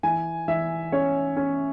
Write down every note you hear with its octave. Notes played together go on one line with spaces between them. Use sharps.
E3 G#5
E3 E5
C#4 C#5
C#4